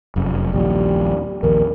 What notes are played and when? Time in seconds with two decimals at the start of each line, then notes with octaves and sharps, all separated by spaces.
0.16 F1 F#2
0.53 A#1 D#2 A#2 G3
1.43 A#1 D#2 A#4